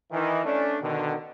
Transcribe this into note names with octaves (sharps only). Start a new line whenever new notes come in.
D#3 E3
A3 C#4 D4
B2 D3 D#3